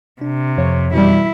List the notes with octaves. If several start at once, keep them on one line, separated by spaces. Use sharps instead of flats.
C3 D4
F2 C#5
B2 E3 G3 E4